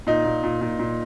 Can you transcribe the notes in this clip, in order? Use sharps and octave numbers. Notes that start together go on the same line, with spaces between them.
A#2 D#4
A#2
A#2
A#2
A#2